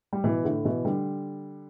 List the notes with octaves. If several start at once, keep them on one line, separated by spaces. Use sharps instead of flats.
G3
B2 E3
A2 D3
B2 E3
D3 G3